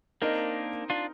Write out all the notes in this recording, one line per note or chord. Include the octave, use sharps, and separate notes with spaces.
A#3 C4 D4 D#4 A#4 D#5
D4 F4